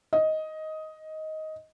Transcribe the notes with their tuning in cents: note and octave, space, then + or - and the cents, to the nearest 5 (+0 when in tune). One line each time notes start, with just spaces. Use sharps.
D#5 +10